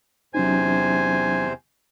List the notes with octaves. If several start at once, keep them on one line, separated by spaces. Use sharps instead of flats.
E2 C3 F#3 C#4 D#4 C5 G#5